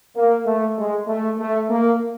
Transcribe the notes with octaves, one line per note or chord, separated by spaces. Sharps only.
A#3
A3
G#3
A3
A3
A#3